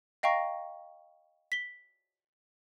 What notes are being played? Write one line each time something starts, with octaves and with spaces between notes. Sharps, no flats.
D#5 F5 G5 A#5 C#6 A#6
B6 G7